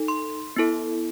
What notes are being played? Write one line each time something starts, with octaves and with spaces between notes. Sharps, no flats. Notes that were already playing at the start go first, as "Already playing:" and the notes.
Already playing: D#4 A4
C6
B3 E4 A4